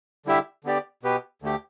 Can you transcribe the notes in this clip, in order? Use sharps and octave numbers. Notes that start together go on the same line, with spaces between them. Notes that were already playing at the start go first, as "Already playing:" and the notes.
D3 G3 E4 G4 E5
D3 B3 G4 D5
B2 B3 G4 B4
D2 D3 A3 G4